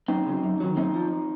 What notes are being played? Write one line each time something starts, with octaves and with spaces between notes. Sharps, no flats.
F#2 C4 D#4
C#3 F#3
F#2
D#3 F#3
F#2 C4 D#4
F3